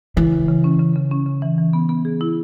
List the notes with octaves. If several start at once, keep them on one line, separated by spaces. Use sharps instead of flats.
C#3 E3
C#3
C#3
C#4
C#3
C#3
C#4
C#3
E3
E3
B3
B3
G#4
E4